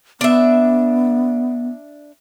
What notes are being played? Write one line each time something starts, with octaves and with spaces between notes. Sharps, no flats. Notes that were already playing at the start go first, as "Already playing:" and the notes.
B3 D4 E5